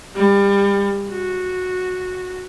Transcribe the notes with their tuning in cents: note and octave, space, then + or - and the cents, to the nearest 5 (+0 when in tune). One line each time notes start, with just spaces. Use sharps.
G3 +30
F#4 -10